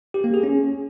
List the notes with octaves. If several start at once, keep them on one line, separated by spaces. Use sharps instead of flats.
G4
A#3
G#4
C#4